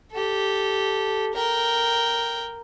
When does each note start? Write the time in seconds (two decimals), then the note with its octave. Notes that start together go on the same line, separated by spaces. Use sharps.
0.12 G4 A4
1.33 A#4 G5